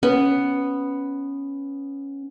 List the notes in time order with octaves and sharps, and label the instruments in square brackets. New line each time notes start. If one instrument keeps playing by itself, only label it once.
[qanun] B3 [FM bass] C#4